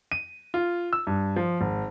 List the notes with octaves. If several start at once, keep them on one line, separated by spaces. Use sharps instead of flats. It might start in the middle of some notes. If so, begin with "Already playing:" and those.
D#7
F4
E6
G2
F3
G#1